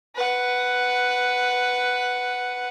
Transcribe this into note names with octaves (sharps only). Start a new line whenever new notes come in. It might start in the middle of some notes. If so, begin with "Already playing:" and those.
B4 F#5